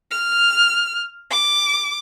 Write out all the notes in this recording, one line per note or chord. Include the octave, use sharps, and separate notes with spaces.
F6
D6